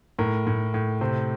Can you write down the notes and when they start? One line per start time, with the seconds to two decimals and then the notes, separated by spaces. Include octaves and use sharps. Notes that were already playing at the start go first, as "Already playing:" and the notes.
0.19 A2 A#4
0.47 A2
0.74 A2
1.01 C3 C5